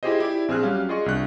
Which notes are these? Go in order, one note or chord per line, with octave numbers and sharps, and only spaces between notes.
E4 F4 G4 G#4 C5 D#5
E4 G4 D5
A#1 C4 G#4 F6 F#6
F#3 G3 C#4 F5
F4 G#4 D5 D#5 C6 C#6
C2 D4 F#6